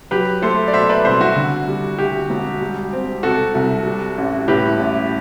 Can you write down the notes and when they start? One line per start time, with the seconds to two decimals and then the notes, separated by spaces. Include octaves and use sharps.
0.11 F#3 G4 B4
0.42 A3 A4 C5
0.68 D5
0.73 B2 C5 E5
0.89 B4 D5
1.04 C2 C5 E5
1.21 F#4
1.36 D3
1.68 G3
1.98 D2 G4
2.30 E1
2.61 G3
2.93 C4
3.23 C3 F#4 A4
3.55 C2
3.86 G3
4.18 A1
4.48 A2 G4 B4
4.80 A1